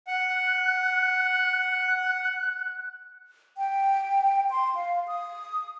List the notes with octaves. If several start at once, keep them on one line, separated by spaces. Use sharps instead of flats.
F#5 F#6
G5
C6
F5
D#6